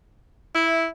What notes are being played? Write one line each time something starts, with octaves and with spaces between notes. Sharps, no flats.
E4 E5